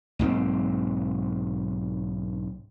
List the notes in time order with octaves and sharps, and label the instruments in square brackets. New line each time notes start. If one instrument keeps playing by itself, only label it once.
[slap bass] B1 G#2 A#3 C4